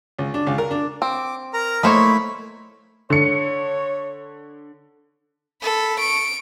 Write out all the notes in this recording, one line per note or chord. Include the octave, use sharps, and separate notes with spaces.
C#2
D4
C#2
A#4
D4
C4 D6
A#4 A#5
A3 A#3 D#4 E4 C5 C#5 B5
D3 C#5 C#7
A4 B5
C#6 D7